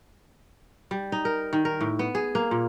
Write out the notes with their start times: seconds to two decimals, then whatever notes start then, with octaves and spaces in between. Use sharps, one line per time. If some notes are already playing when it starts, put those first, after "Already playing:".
0.91 G3
1.12 D#4
1.25 A#4
1.53 D#3
1.65 A#4
1.81 A2
1.99 B3
2.15 G#4
2.35 A#3
2.51 A#2